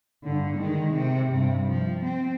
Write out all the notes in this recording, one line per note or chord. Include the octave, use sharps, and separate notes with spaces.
G2 D3
D#3 G#3
C3
G2 C3
F3
C4